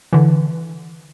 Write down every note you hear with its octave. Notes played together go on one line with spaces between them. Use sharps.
D3 E3